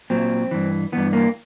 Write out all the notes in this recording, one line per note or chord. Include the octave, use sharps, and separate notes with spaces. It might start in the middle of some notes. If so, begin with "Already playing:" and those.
A#2 F#3 C4
G2 E3
G2 E3 B3
A#3